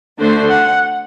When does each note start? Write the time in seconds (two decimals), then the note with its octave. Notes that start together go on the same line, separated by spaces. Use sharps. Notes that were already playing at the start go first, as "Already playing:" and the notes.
0.19 D3 A3 D4 F#4 C5
0.50 F#5